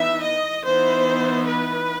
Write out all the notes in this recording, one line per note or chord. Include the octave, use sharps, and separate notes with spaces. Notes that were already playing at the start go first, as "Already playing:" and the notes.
Already playing: E3 B3 D#4 E5
D#5
E3 B3 D#4 C5
B4